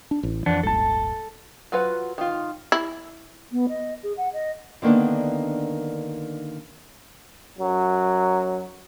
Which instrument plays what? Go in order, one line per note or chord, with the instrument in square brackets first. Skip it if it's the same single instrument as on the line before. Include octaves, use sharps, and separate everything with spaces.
[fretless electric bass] D4
A1
[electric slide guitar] F2 D4 F#5 [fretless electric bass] E3
[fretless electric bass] D#1 G#1 [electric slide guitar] A4 A5
[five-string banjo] F#3 F4 B4 F#5
D#3 F4
[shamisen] E4
[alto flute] B3
D#5
G#4
F#5
D#5
[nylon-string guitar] D3 D#3 A#3 B3 D4
[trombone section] F#2 F#3